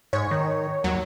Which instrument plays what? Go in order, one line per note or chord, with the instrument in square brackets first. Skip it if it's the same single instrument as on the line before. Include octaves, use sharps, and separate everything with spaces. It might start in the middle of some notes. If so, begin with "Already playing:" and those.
[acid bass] G#2 [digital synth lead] C#5
[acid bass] D#3
[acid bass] D#2 [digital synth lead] F#3